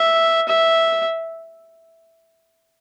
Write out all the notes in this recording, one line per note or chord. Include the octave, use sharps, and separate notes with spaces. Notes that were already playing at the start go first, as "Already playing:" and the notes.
Already playing: E5
E5